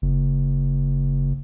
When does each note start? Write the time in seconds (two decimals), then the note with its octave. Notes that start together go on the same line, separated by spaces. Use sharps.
0.02 F#1